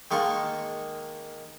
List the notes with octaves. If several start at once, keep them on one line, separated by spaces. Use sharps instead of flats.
D#3 G#3 A#3 A#4 A5 C#6